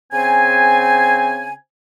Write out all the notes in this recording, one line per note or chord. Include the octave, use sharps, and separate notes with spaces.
C#3 C4 C5 G#5